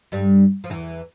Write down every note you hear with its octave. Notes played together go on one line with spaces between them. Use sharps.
G2 G3
F3
E2 E3